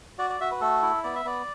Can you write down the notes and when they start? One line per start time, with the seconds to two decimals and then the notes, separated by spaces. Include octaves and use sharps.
0.18 F#4 D5
0.30 D5
0.41 F#4 E5
0.51 B4
0.61 A3 A4
0.83 E4
1.04 B3 D5
1.15 E5
1.25 B3 D5